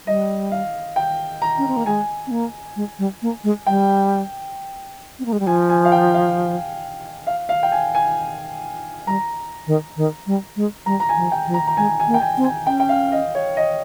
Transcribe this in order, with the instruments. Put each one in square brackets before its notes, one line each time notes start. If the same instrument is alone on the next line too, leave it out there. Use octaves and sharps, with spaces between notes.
[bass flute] G3 [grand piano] D#5
[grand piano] F5
G5
A#5
[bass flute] C#4
C4
A#3
[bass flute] G#3 [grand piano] G#5
[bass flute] C4
A#3
G#3
G3
A#3
G#3
[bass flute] G3 [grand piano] G5
[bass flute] C4
A#3
G#3
G3
[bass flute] F3 [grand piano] G#5
[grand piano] G#5
F5
G5
F5
F5
F5
G5
G#5
G#5
[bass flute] G3 [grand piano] A#5
[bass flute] D#3
D#3
G3
G#3
[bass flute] G3 [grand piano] A#5
[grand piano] A#5
G#5
[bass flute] F3
[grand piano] G5
[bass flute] F3
[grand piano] A#5
A#5
[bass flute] G#3 [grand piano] G#5
[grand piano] G#5
[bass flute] A#3
[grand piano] G5
G#5
[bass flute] C4
[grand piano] G#5
[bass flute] C#4 [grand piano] G5
[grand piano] G5
F5
D#5
C#5
D#5